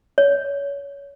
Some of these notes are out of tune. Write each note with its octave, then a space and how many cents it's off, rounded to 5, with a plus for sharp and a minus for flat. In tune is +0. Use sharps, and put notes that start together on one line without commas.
C#5 +25